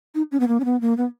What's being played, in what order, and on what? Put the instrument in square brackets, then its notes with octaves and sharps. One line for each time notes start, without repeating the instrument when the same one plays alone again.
[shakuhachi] D#4
C#4
B3
A#3
C#4
B3
A#3
B3